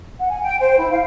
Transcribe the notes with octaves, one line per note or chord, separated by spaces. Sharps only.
F#5
G#5
G5
C5
E4
F5